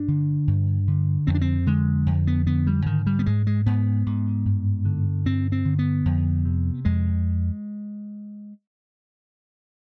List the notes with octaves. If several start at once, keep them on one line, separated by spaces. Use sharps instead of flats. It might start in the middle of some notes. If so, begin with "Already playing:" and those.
Already playing: G2 D4
D3
G2
D3
F2 C4
D4
C4
D3 G#3
F2
B3
D3 B3
G3
G#2 D#3
G3
B3
G#2 G#3
G#3
G#2 B3
G#2
G2
D3
G2 C4
C4
D3
B3
F2
C3
F2 G#3